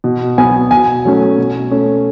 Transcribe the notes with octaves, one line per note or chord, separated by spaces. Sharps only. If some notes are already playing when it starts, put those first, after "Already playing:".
B2
F#3 B3 G#5
B2 G#5
F#3 A3 C#4
B2
A3 C#4